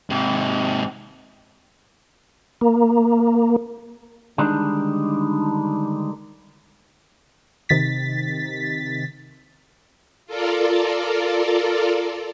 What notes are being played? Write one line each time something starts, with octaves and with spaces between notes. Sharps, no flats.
G#2 C3
A#3
D3 D#3 G3 G#3 D4 D#4
C3 D#3 A6 B6
F4 A4 A#4 D5